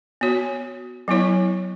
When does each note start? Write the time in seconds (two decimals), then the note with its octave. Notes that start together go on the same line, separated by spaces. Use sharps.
0.21 B3 F#4 C#5
1.08 F#3 B3 E4 C#5